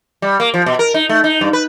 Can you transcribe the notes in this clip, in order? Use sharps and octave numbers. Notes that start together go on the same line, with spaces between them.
G3
A#3
F3
B2
A#4
D#4
A3
D#4
G2
B4